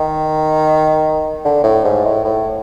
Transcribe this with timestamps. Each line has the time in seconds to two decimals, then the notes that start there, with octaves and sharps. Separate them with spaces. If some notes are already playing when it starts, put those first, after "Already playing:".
Already playing: D#3
1.45 D3
1.64 A2
1.84 G#2
2.05 A2
2.25 A2